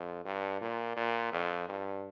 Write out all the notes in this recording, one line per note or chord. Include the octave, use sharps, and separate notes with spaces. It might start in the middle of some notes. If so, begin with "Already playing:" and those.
Already playing: F2
G2
A#2
A#2
F2
G2